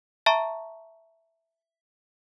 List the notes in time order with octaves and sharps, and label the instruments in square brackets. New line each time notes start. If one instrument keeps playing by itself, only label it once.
[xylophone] E5 A5 A#5 C#6